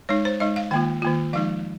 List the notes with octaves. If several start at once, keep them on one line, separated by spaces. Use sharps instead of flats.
G#3 D#4 C#5
C5
G#3 D#4 D#5
F5
D#3 A#3 F4 G5
D#3 A#3 F4
F3 G#3 D#4 F5